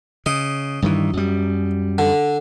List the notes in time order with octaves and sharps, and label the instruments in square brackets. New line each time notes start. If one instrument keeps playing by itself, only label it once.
[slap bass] C#3 [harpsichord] D#5
[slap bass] G2 D#3 E3
F#2 G3
[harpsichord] D3